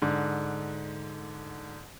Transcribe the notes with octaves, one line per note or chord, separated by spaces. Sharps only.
G#2 D3